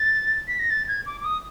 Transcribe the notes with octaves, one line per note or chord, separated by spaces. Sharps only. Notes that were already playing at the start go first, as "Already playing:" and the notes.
Already playing: A6
B6
A#6
A6
G#6
D6
D6
D#6